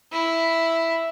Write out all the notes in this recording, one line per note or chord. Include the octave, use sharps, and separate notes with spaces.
E4